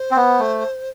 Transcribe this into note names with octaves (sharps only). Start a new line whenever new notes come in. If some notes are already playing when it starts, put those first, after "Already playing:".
Already playing: C5
C4
B3
A3